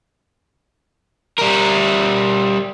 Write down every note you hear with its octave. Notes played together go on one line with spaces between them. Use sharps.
G3 A#4